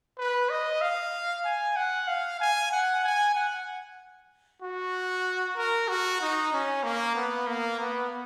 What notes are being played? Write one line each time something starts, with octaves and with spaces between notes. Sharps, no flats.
B4
D#5
F5
G#5
F#5
F5
G#5
F#5
G#5
F#5
F#4
A#4
F#4
D#4
C#4
A#3
B3
A#3
B3